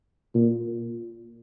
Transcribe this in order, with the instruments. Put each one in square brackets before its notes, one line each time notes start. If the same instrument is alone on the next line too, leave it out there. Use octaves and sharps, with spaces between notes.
[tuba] A#2